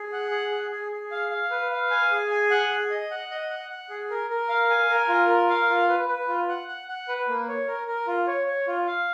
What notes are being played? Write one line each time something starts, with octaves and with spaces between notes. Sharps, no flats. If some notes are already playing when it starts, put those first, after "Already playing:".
Already playing: G#4
F#5
G#4
G#4
G#4
G#4
F5
F5
B4
F5
G#5
G#4
G#5
F#5
G#4
D#5
F#5
D#5
F#5
F#5
G#4
A#4
A#4
F5
G#5
A#4
F4
A#4
F5
F4
B4
B4
F4
F#5
F#5
F#5
B4
A#3
C#5
A#4
A#4
F4
C#5
C#5
F4
F5